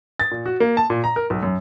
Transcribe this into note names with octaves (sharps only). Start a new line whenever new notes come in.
A6
A#2
F#4
A#3
A5
A#2
A#5
A#4
B1
F#2